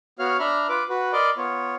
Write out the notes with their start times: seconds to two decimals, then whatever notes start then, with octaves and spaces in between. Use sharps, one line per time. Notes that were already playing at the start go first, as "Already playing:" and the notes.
0.19 B3 F#4 C#5 F5 F6
0.39 D4 E5 A#5 B5 F6
0.69 F4 B4 D6
0.89 F#4 B4
1.13 A#4 D5 D#5 B5 C6 D6
1.37 B3 F4 C#5